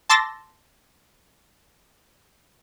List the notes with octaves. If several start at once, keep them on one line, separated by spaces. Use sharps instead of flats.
A5 C6 D6 E6 A6 A#6